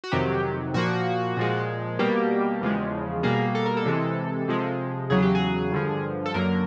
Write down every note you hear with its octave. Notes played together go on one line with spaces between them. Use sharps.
F#4
F2 C3 D#3 F#3 G4
A#2 F3 A#3 F#4
A#2 F3 G#3
B2 G3 A#3 G4
E2 C#3 F3 G#3
B2 G3 A#3 G#4
A4
A#4
A4
C3 E3 G#3
C3 F3 G#3
E2 C#3 F#3 G#4
G4
G#4
G2 D3 F3
A4
F#2 D3 F#3 A#3 A#4